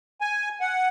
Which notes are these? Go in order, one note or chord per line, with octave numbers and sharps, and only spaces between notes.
G#5
F#5